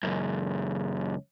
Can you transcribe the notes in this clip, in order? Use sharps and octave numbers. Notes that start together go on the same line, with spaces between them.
C#2 F#2